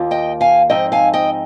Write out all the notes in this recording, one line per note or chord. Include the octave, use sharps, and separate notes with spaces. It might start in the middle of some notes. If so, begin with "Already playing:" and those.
Already playing: D#2 A#3 F4
D#5 G5
F5 G#5
G#2 F3 C4 D#4 D#5 G5
F5 G#5
D#5 G5